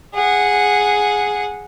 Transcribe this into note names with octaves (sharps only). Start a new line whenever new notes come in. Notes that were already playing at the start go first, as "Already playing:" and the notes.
G#4 F#5